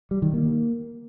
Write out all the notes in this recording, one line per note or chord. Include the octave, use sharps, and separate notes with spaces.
G3
D#3
A#3